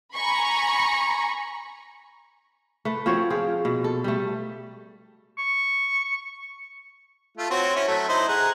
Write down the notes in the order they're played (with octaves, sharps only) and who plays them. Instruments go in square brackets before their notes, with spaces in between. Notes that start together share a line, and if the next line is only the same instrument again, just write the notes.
[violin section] G#5 A#5 B5 C#6
[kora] A3 B4
F3 C4 F#4 C#5
F4 G#4 G5
B2
A4
G3 A3
[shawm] C#6
[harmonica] A3 F4
C4 F#4 C#5
C#4 E4 C#5
F#3 A3
D#4 E4 C5
G#4 F#5 A#5